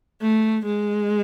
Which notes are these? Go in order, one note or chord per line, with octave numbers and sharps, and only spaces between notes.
A3
G#3